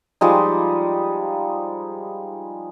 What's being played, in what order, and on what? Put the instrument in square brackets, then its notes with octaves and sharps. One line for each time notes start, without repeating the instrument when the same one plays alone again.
[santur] F3 G3 G#3 D#4